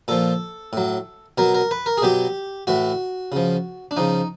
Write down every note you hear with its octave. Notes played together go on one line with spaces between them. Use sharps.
A#2 F3 A4
A2 F#3
B2 F#3 A#4
A#4
B4
A#4
G#4
B2 F#3 G4
A2 E3 F#4
C#3 F3
D4
C#3 F3 D#4